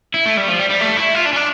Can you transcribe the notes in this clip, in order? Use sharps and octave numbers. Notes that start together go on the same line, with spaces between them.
E4
A3
G3
F3
G3
G3
A3
E4
F4
D4
C#4
D4